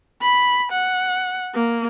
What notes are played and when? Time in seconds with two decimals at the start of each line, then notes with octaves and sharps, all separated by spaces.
0.22 B5
0.72 F#5
1.55 A#3